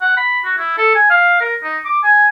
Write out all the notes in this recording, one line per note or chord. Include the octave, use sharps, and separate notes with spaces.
F#5
B5
F#4
E4
A4
G#5
F5
A#4
D#4
D6
G#5